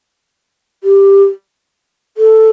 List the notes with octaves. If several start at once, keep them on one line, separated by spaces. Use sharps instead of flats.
G4
A4